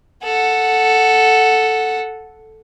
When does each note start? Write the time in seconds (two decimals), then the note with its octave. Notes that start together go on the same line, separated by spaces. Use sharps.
0.24 A4 F#5